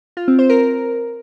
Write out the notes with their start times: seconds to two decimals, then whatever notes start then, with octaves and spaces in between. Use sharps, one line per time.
0.17 F4
0.28 C4
0.39 C5
0.50 A#4